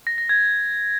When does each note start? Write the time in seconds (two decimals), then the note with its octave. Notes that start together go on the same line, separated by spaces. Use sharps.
0.07 A#6
0.18 A#6
0.29 G#6